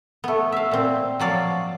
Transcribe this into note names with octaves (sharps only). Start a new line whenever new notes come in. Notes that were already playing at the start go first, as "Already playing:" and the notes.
A3 B3
E5 F5
A#2 C4
F3 F#3 D5 F5